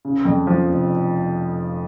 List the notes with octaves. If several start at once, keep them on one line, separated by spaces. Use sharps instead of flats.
C#3
F2
F3
F1